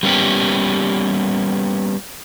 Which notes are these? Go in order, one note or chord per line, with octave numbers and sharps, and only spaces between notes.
G3 A#3 B3 C#4 F#4 G4